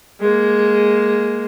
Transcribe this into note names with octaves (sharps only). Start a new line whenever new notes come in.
G#3 A#3